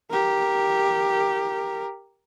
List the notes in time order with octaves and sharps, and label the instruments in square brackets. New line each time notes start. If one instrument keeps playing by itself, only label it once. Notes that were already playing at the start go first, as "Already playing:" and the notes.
[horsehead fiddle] G4 A#4